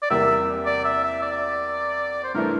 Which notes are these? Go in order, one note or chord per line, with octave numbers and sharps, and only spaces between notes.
D5
E2 C3 G3 A#3 E4 E5
D5
E5
E5
D5
C5
G2 E3 A3 A#4